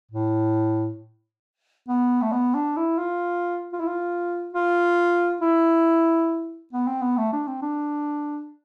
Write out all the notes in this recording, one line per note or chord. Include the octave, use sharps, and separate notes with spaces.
A2
B3
A3
B3
D4
E4
F4
F4
E4
F4
F4
E4
B3
C4
B3
A3
D4
C4
D4